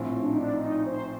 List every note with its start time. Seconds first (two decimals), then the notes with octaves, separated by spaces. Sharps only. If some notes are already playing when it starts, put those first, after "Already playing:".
Already playing: A#1 A2 F3 C4
0.23 D4
0.30 D#4
0.37 D4
0.54 D#4
0.86 C5